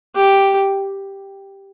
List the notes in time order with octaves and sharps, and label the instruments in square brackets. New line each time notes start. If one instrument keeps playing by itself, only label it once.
[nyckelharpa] G4